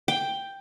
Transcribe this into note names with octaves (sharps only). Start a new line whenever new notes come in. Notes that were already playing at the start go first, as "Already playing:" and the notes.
G5